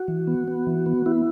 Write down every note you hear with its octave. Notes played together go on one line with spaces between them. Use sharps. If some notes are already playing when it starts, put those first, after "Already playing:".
Already playing: F#4
E3
B3
B3
E3
B3
B3 E4